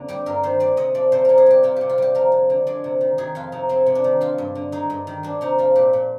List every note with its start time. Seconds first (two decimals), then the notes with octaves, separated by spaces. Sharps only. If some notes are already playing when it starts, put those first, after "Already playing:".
Already playing: F2 D3 A#3 C4 D4
0.09 G3 G4
0.26 G2 A#4
0.43 D#3 C5
0.60 G#3 D5
0.77 C3 D#5
0.95 F3 D5
1.12 C3 C5
1.25 C3 A#4
1.38 G#4
1.46 G3 G4
1.63 C3 F4
1.76 C3 G4
1.90 F4
1.98 G3 G4
2.15 F3 A#4
2.32 F2
2.50 D3
2.67 G#3 D5
2.84 C3
3.01 D#3
3.18 D#3 G#4
3.35 F2 F4
3.52 C3 D#4
3.69 G#3 C4
3.86 C3
3.95 D4
4.04 D#3
4.21 G#3 F4
4.38 G2
4.55 D3
4.72 G#3 D#4
4.90 G2
5.07 D#3
5.23 G#3 D4
5.41 C3 D#4
5.58 F3 F4
5.75 A#2 G4
5.93 A#2